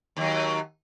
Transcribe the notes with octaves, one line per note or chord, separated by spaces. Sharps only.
D#2 F#3